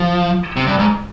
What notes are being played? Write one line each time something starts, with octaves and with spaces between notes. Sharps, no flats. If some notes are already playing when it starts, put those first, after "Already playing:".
Already playing: F3
C3
G2
G#2